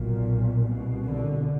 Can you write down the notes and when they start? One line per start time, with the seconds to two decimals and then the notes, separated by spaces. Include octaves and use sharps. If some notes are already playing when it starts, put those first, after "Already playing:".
Already playing: B1 A#2
0.67 C2 B2
1.06 D3